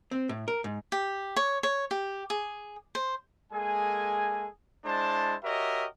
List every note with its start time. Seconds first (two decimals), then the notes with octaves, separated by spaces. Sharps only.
0.11 C4
0.29 A2
0.48 A#4
0.64 G#2
0.92 G4
1.36 C#5
1.63 C#5
1.91 G4
2.30 G#4
2.95 C5
3.53 G#3 A#3 G#4 A4 G#5
4.85 G#3 D4 E4 C5 A5
5.44 F#4 G4 A#4 C#5 D#5 E5